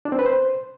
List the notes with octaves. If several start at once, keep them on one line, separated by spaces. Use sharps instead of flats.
D4
C4
B4
C5